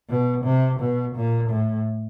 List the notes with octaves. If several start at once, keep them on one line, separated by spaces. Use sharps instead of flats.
B2
C3
B2
A#2
A2